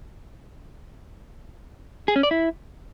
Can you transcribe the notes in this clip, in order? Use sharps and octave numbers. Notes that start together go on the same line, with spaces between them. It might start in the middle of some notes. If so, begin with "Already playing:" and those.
G#4
C#4
D5
E4